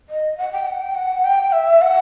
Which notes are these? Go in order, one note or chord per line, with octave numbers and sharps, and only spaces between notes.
D#5
F#5
G5
F#5
G5
F#5
G5
E5
F#5